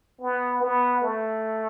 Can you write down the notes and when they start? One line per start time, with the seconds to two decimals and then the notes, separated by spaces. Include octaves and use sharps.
0.21 B3
0.62 B3
1.03 A3